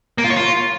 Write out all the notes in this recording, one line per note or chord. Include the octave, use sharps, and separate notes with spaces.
A#3
F4
C#5
F4